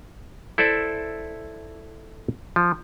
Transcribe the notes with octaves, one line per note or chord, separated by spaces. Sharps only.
E4 A4 C5 D5 E5
F3